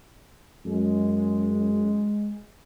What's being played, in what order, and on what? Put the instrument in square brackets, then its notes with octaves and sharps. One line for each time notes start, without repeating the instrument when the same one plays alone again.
[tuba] F#2 [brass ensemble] G#3